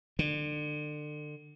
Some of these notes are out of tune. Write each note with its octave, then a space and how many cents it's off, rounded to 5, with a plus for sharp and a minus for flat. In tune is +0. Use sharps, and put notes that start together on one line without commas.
D3 +30